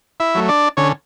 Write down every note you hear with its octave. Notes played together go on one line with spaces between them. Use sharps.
E4 E5
F#3 A3
D4 D5
D3 C#4 C#5